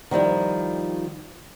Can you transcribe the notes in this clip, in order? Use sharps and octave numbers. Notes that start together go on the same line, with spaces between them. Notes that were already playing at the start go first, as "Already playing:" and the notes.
D#3 F3 G3 E4